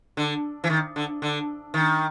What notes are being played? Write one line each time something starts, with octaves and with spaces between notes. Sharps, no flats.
D3
E3
D#3
D3
D3
D#3